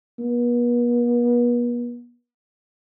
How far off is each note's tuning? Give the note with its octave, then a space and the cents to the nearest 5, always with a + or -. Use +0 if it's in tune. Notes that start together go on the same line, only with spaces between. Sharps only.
B3 -40